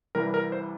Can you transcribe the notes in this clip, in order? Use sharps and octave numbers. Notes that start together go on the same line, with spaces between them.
C2 C3 E3 G3 A#4
A#4
C5